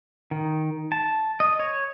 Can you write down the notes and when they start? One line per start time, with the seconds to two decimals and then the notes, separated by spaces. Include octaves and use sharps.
0.31 D#3
0.92 A5
1.40 D#5
1.60 C#5